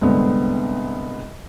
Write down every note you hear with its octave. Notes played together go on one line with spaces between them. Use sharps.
C2 G#2 D3 B3 C4